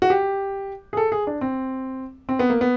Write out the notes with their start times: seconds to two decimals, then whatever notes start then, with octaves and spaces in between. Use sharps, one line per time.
0.02 F#4
0.10 G4
0.93 G#4
0.97 A4
1.12 G#4
1.27 D4
1.41 C4
2.29 C4
2.39 B3
2.50 A#3
2.61 B3